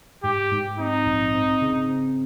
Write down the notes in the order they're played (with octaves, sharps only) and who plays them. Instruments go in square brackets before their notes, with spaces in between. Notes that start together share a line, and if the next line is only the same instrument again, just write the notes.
[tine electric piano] G#2 [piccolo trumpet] G4
[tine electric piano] G#2
[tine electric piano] C4 [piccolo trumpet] D#4
[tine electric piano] A#1
C4
C#3
C4